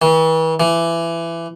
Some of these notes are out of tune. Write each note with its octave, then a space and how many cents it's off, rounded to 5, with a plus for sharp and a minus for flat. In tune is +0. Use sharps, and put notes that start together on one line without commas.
E3 -40
E3 +20